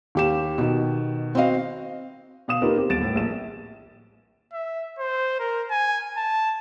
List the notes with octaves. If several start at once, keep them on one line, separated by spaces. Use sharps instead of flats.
D#2 G4 E7
B2 D#3
C4 F#4 D#5 F5
B2 F5 D#6 E7
A#3 D#4 F4 G4 A#4 B4
C4 G4
D#1 B1 A6 D7 E7
A2
A#1 E7
E5
C5
A#4
G#5
A5